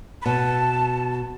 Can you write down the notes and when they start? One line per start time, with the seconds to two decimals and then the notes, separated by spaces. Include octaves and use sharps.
0.22 B5
0.25 B2 A5